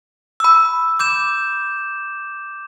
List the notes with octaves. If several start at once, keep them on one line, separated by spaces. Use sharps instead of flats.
B5 E6
D6 G6 E7